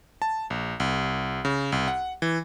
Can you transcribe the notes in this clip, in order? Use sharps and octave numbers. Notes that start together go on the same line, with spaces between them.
A5
A#1
C2
C#3
C2
F#5
E3